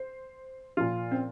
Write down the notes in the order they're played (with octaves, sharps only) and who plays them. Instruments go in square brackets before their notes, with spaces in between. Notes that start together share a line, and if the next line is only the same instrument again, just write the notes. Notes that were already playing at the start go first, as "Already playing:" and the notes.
Already playing: [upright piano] C5
A#2 F3 F4
C4